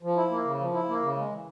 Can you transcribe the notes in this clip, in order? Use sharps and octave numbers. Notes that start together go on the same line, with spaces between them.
F3
E4
A#3
C#3
F3
E4
A#3
C#3
G#3
E3